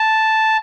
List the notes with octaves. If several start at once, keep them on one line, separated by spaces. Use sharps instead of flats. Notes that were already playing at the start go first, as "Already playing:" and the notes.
Already playing: A5